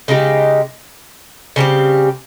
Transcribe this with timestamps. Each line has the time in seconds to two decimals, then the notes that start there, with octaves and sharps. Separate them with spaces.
0.08 C#3 G#3 D#4 G4
1.56 C#3 G3 C4 G4